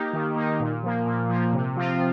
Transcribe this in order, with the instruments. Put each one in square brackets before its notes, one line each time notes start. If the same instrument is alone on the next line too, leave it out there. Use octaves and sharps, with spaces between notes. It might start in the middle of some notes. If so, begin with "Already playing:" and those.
Already playing: [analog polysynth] A#3 D#4 G4
D#3
A#3 D#4 G4
A#2
F3 A#3
A#2
F3 A#3
C3
F3 C4 F4